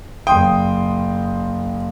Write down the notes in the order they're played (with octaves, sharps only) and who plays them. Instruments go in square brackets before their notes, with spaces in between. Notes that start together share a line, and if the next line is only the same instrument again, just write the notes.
[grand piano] F#1 C6 D#6 [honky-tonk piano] G5